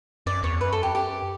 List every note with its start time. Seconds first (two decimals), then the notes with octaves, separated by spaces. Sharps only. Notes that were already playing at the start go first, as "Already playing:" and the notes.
0.26 F#2 D5
0.43 E2 C#5
0.60 F#2 B4
0.73 A4
0.83 G4
0.95 G4